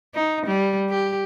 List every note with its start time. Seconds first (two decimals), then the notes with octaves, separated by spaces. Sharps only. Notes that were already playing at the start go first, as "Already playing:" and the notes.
0.15 D#4
0.47 G3
0.90 G4